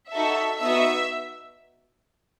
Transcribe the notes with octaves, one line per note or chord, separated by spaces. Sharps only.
D#4 F#4 A4 E5
B3 D#4 F#4 E5